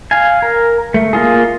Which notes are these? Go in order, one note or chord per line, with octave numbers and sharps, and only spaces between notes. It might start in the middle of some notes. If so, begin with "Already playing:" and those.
F5 G#5
A#4
A3
A#3 F4 G#4